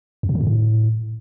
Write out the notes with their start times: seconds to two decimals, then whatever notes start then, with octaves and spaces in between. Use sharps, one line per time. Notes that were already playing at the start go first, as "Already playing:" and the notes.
0.23 F2
0.29 B2
0.35 D3
0.41 G2
0.47 A2